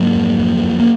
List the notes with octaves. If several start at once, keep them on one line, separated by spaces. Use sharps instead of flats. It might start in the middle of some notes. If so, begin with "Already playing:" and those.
Already playing: G#2 F#3 A#3
F2
F2
F2
A#3